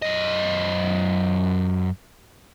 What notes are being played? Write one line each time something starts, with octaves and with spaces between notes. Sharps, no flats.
F#2 D#5